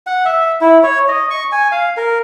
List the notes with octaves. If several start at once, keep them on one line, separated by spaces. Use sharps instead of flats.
F#5
E5
E4
C#5
D#5
C#6
G#5
F5
A#4